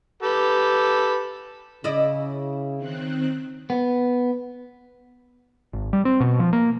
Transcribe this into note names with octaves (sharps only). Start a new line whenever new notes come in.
G4 A4 B4
C#3 E4 D5 D#5
D#3 C4 F#6
B3
G#1
G3
C4
B2
F3
A#3